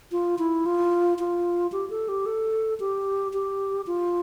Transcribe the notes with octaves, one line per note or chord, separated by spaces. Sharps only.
F4
E4
F4
F4
G4
A4
G4
A4
G4
G4
F4